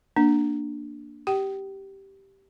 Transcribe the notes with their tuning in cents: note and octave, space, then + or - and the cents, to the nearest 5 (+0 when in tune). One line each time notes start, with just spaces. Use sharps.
A#3 +0 D4 +0
G4 -10 G5 -35